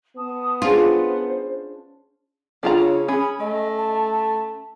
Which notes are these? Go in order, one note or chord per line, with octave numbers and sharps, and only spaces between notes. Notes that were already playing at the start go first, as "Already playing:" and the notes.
B3 A5 D#6
C#4 D4 F4 G#4 C5
C#3 D4 F4 A#5
C#5
C#4 G#4 B5
A3 D#5
A5